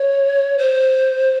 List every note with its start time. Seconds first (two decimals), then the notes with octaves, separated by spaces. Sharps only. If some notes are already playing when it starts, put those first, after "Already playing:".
Already playing: C#5
0.58 C5